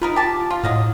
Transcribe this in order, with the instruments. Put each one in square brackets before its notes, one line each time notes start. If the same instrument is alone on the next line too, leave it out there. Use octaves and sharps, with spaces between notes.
[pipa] D#4 A#4 B4 [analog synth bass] F4
[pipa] G4 A5
F4
[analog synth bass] A2 [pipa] F#3 D#5 F5